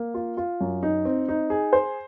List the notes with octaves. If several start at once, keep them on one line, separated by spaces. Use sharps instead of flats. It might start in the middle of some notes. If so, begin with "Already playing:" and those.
Already playing: A#3
F4
F4
F#2
D#4
C4
D#4
G#4
C5